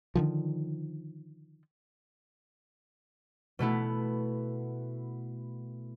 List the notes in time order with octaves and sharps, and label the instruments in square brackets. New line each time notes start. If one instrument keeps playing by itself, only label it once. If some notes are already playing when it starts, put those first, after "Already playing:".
[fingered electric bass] D3 D#3 F3
[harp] B2 A3 B3 E4